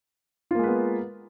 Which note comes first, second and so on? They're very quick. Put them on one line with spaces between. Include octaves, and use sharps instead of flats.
F4 A#3 G#3 B4 B3